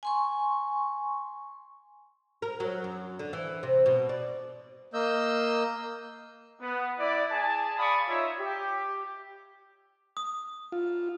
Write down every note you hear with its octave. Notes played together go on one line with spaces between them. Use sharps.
G#5 C6 C#6
A#4
F#3
F#2
D3
E3
C3
B2
D5
A#3 D#5 E6 G6
B3
E4 D5
G#4 G#5 A5
D5 F5 B5 C#6 D#6
D#4 F4 C#5 E5
G4
D#6
F4